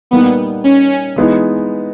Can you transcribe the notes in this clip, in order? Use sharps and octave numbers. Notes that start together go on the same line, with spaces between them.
A#2 G3 A#3 B3 D#4
C#4
E3 G#3 B3 D#4